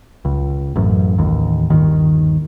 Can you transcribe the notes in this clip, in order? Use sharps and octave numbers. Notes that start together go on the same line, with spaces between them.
C#2
A1 F#2
A1 D#2
G1 D#2 D#3